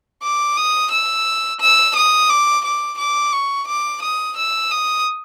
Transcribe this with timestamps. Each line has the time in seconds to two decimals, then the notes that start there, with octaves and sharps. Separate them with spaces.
0.23 D6
0.57 D#6
0.91 E6
1.60 E6
1.96 D#6
2.29 D6
2.65 D6
2.98 D6
3.33 C#6
3.68 D6
4.02 D#6
4.36 E6
4.71 D#6